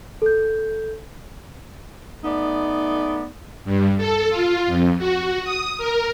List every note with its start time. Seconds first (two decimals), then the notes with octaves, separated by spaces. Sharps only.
0.22 A4 G6
2.23 A3 B3 D#4 D5
3.65 G2
3.97 A4
4.30 F4
4.67 F2
4.98 F#4
5.43 D#6
5.78 A#4